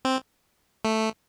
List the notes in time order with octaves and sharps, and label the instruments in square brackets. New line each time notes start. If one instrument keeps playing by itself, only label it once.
[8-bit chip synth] C4
A3